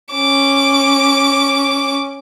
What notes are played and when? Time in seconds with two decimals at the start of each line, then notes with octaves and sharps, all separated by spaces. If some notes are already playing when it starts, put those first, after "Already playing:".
0.12 C#4 D6